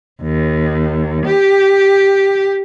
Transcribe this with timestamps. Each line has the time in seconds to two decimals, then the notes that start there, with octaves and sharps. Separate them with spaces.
0.22 D#2
1.26 G4